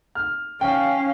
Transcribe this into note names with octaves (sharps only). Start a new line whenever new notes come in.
F6
C#4 F5 G5